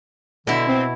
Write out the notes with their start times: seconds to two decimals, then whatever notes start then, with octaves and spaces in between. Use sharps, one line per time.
0.47 B2 D3 E4
0.68 C4